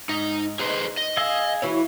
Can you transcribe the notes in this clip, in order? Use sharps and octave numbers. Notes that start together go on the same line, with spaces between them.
G#2 D#4
D#4 G#4 B4 C5
D#5
G#4 F5 E6
E3 E4 F#4 C#5